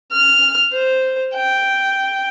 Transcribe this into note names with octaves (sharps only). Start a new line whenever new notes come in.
F6
C5
G5